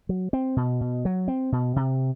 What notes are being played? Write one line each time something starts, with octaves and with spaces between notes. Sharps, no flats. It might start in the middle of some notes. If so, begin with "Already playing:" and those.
F#3
C4
B2
B2
F#3
C4
B2
C3